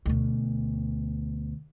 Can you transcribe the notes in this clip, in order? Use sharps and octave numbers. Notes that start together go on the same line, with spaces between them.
D2 B2